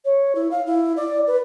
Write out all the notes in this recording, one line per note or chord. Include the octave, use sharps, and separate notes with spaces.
C#5
E4
F5
E4
D5
B4